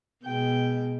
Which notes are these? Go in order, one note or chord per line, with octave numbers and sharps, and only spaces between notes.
B2 G#3 G5